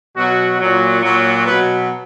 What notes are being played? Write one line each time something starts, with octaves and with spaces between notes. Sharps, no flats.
B2 F#3 F#4
A#2 F#3
A#2 F#3
B2 F#3 B4